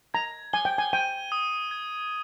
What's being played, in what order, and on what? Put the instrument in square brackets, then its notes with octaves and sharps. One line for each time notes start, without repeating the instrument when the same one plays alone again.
[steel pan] A#5 [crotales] G#6
[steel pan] G#5 [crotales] G7
[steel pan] G5
G#5
[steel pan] G5 [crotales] D#7
[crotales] D#6
G#6